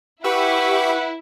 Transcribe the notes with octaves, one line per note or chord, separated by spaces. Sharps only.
E4 G4 B4 F#5 C#6 E6